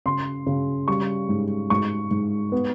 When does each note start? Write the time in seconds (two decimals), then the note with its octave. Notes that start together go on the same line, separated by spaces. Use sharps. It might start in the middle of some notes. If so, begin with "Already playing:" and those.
0.06 C#3 C6
0.47 C#3
0.88 G3 C#6
1.29 G#2
1.70 G#2 C#6
2.11 G#2
2.52 B3